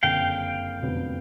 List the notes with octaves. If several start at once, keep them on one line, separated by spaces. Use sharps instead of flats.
F#1 F2 D3 F5 G5
F1 F2 D3 F#3 B3